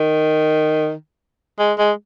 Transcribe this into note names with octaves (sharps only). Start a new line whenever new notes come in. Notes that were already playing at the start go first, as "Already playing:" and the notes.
Already playing: D#3
G#3
G#3